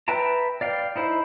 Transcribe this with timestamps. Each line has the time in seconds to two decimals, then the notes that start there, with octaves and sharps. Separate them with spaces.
0.08 B4 E5 G5 A5 A#5
0.61 D5 F5 G5
0.96 D#4 E4 C5